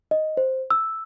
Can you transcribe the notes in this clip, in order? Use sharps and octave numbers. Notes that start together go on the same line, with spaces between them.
D#5
C5
E6